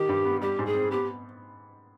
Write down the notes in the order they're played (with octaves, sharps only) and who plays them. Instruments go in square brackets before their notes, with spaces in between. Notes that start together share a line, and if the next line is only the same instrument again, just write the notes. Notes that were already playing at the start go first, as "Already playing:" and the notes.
Already playing: [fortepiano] D#3 [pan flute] G4
[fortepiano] G2
B3
[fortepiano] G3 [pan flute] G4
[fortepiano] G#2
[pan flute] G#4
[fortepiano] C4
[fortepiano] B3 [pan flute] G4